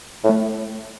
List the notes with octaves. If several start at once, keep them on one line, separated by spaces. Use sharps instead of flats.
A2
A3